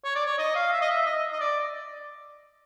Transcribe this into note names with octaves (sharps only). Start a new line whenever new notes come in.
C#5
D5
C#5
D#5
F5
E5
D#5
E5
D#5
D#5
D5